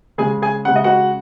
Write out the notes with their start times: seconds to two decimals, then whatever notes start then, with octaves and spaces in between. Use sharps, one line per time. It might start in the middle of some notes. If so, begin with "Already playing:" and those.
0.18 C#3 G#3 G#4 G#5
0.42 G#4 G#5
0.65 C#3 G#3 F#5
0.76 D#5
0.84 F#4 F#5